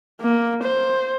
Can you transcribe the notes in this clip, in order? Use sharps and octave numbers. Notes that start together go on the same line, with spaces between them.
A#3
C5